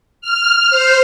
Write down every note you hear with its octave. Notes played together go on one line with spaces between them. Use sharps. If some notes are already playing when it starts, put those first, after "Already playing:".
F6
C5